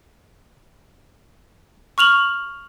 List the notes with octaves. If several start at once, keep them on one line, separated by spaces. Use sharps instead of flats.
C#6 F6 F7 F#7